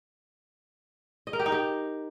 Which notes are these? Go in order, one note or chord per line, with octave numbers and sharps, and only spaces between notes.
D#5
A#4
G4
D#4
G4